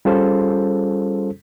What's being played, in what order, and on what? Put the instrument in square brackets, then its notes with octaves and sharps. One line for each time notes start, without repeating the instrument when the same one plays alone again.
[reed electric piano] G3 C#4 F4 G#4 A4 C5